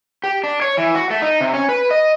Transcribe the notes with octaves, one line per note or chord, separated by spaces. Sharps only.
G4
D4
C#5
E3
F#4
A3
D#4
C3
C#4
B4
D#5